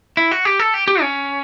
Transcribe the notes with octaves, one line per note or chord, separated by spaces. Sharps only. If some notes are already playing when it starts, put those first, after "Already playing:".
E4
F#4
G4
A4
G4
G4
C#4